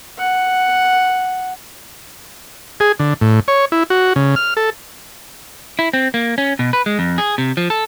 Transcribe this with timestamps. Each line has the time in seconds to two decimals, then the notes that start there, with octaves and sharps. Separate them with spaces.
0.18 F#5
2.80 G#4
2.99 D3
3.21 A2
3.48 C#5
3.72 E4
3.90 F#4
4.16 C#3
4.36 F6
4.57 A4
5.79 E4
5.93 C4
6.14 A#3
6.38 C#4
6.59 B2
6.73 B4
6.86 G#3
6.99 F2
7.18 G#4
7.38 C3
7.57 F3
7.70 A4